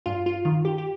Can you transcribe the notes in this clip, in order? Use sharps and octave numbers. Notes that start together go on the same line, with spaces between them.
G2 F4
F4
D#3 F4
G4
G4